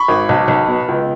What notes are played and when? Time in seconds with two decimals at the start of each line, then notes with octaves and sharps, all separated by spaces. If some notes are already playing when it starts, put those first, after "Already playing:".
Already playing: B5 C#6
0.08 G#1
0.29 B1
0.48 B1
0.68 B2
0.88 C#2